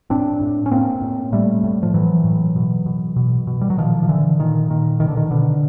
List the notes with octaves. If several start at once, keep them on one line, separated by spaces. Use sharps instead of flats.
A2 C4 D4
A2
C#4
A2 A#3 C4
A2
A2 G3 A3
A2
F3
A2 E3 F#3
A2
B2
B2
B2
B2
G3
F#3
A#2 D#3 F3
F3
A#2 D3 E3
A#2 D#3
A#2 D#3
B2 D#3
D3
D#3
B2 D3